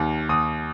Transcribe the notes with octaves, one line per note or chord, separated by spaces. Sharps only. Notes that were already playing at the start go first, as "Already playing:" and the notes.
Already playing: D#2 D#3
D#2 D#6